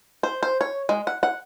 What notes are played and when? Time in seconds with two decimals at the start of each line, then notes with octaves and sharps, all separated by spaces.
0.23 C5
0.43 C5
0.61 C#5
0.89 G#3
1.07 F#5
1.23 F#5